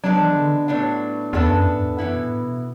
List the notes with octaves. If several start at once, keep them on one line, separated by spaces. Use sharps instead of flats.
F#3 G#3 B3 D4
E3
D3
C#3
A2 F#3 B3 D4
E2 E3 B3 D4 A4
F#2
G#2
E2
F#2 E3 B3 E4
B2
A2
B2